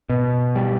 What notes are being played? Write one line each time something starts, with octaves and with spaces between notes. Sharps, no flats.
B2
G3